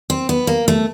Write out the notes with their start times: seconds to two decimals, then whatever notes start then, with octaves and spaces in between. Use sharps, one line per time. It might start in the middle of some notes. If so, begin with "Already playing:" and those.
0.10 C4
0.29 B3
0.47 A#3
0.68 A3